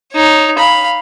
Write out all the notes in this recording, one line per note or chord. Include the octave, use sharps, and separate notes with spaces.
D#4 C#5
F5 B5